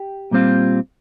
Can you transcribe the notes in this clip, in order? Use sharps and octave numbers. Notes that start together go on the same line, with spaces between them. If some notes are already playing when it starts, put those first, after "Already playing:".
Already playing: G4
A#2 G3 C4 F4